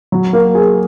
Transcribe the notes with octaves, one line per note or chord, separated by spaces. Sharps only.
F#3
A#3
G#4